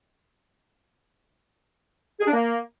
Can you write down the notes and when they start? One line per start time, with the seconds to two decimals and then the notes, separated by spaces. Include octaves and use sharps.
2.20 G#4
2.27 D4
2.33 A#3